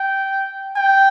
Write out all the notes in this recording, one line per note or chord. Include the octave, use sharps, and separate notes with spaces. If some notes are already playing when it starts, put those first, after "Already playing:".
Already playing: G5
G5